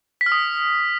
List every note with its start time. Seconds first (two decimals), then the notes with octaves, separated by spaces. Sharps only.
0.21 B6
0.26 F6
0.32 D#6